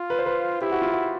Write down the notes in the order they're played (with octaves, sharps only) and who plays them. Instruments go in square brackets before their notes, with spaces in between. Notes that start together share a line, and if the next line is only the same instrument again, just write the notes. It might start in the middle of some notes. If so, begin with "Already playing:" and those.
Already playing: [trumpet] F4
[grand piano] B4
C5
B4
[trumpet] E4 [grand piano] G4
[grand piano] F#4
F4
F#4